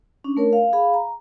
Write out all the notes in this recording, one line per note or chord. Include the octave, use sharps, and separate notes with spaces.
C#4 D4
A3 A#4 C#5
F5
G#4 F5 B5
A#5